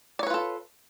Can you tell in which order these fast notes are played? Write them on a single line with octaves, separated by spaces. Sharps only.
D5 C#5 B4 F4 A4